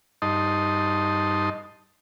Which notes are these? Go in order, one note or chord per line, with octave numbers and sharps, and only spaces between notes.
G2 D#4 D#5 A5 C6